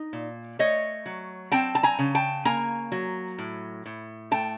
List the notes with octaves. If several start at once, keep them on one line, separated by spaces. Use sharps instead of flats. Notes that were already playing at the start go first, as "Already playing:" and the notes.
Already playing: D#4
A#2
A3 C#5 D#5
F#3
C4 G5 A5
A5
G#5 A#5
C#3
G5 A5
A#3 G#5 A#5
F#3
A2
A2
A3 G5 A5